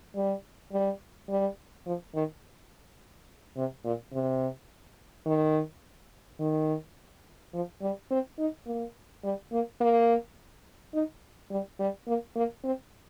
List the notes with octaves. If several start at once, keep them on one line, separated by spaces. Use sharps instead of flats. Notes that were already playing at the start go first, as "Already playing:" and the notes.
G3
G3
G3
F3
D#3
C3
A#2
C3
D#3
D#3
F3
G3
C4
D#4
A#3
G3
A#3
A#3
D#4
G3
G3
A#3
A#3
C4